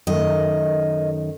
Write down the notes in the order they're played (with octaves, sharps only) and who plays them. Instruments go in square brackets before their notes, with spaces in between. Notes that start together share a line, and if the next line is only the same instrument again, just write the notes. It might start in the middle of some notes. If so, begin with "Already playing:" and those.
[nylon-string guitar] F#2 D#3 A3 [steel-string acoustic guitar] D#5